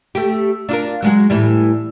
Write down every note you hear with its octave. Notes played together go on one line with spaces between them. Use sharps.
A3 G4
D4 F4 A#4
F#3 G#3 F#4
A2 E3 G3